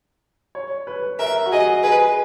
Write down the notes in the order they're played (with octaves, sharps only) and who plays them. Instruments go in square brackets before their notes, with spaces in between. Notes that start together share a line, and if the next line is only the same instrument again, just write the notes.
[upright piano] C#5
B4
[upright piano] A#4 [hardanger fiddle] E5
[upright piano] F#4
[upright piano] G#4 [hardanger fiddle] D#5
[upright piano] G#4 [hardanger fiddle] B4